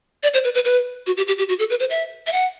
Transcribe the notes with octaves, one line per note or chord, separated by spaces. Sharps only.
D5
C5
B4
B4
B4
F#4
G4
G4
G4
F#4
A4
B4
C5
E5
E5
F#5